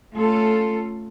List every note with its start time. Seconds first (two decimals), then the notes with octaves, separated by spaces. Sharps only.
0.13 A3 C#4 F4 A4